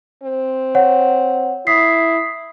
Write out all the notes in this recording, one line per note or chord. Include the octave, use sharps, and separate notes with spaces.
C4
C#5 F#5
E4 D#6 B6 C7